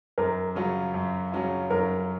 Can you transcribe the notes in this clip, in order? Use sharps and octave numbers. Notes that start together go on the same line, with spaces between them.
F#2 A#4
C#3 F#3 C#4 F4
F#2
C#3 F#3 C#4 F4
F#2 A#4